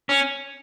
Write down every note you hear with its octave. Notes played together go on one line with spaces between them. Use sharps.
C#4